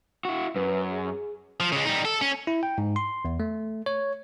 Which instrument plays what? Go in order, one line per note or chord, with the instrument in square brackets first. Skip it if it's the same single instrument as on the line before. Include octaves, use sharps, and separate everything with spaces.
[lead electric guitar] E4 F#4
[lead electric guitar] F#2 [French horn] B4
[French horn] G#4
[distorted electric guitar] F3
C#3 G#3
G3 D#4
A4
C#4
[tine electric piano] E4
G5
G#2
C6
E2
A3
C#5